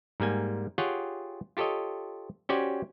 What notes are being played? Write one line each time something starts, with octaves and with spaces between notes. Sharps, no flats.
G#2 G3 A#3 G#5
F4 G4 G#4 C#5 F#5 G5
F4 G4 A4 C#5 D#5
C#4 F#4 G4 C5 D5 G#5